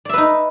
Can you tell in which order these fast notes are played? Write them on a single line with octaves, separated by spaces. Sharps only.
D5 E5 B4 D#4